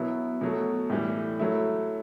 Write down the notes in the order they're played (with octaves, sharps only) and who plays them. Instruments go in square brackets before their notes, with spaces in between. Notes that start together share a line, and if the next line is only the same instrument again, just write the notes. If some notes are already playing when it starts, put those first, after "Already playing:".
Already playing: [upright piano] B2 F#3 B3 E4
B2 F#3 A3
A2 E3 G3
F#3 A3 E4